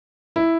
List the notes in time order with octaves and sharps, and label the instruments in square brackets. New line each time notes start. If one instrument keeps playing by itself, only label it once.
[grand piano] E4